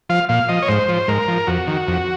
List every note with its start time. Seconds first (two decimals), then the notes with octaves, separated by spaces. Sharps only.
0.09 F3 F5
0.29 A#2 F5
0.49 F3 D#5
0.62 C#5
0.68 G#2 C5
0.89 F3
1.08 G#2 A#4
1.28 F3
1.47 F2 F#4
1.67 D#3
1.88 F2